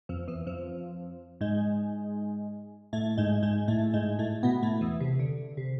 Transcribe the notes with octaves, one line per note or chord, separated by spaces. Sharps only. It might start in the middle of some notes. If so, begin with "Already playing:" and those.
F2 F3
E2 E3
F2 F3
G#2 G#3
A2 A3
G#2 G#3
G#2 G#3
A2 A3
G#2 G#3
A2 A3
B2 B3
A2 A3
E2 E3
C3
D3
C3